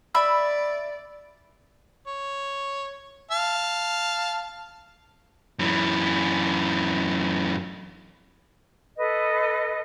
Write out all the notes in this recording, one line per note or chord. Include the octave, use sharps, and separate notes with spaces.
D5 E5 B5 E6
C#5
F5 A5
F#2 E3
A4 B4 D#5